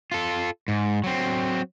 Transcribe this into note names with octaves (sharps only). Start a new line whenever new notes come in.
F4 A4
G#2
F#3 C4